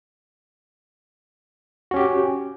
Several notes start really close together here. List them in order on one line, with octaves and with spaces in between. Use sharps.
F#4 C#4 G4